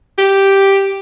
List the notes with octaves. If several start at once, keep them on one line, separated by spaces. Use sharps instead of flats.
G4